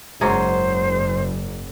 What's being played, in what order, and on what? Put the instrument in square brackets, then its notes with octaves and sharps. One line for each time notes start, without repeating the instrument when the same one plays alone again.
[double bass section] F#1 [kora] G#2 F#3 G#4 [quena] C5